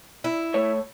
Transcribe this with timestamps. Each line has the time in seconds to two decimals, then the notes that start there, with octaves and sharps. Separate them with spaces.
0.24 E4
0.54 A3 C#5